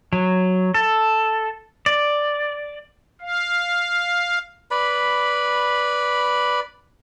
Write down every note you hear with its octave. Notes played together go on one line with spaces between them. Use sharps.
F#3
A4
D5
F5
B4 D5 B5